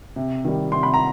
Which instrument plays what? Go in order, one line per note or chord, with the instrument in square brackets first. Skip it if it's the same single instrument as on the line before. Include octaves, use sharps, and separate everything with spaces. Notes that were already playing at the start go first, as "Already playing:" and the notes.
[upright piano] C3
D#3 G3
C3 C6
B5
A#5